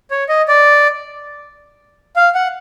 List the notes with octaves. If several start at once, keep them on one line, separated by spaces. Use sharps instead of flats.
C#5
D#5
D5
F5
F#5